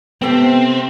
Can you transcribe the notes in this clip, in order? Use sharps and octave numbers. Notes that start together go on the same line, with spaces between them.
C3 B3 C4 G4 A4 G5